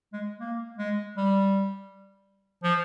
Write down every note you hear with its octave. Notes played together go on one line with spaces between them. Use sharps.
G#3
A#3
G#3
G3
F3